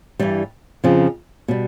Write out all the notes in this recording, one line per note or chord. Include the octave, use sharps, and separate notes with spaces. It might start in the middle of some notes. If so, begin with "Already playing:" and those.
G2 E3 G3
F2 C#3 F3
B2 G3